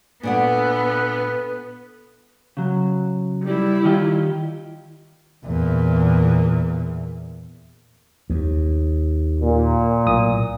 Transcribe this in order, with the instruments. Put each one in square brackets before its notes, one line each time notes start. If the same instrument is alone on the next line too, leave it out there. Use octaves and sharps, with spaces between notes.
[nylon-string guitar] A#2 D4 F#5 [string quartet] B3 [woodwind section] A4 B4
[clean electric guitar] C#3 F#3
[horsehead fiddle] G3 E4
[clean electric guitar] D#3 F4 G4
[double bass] E2 A#2
[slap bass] D#2
[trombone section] A#2
[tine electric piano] B1 A2 D#6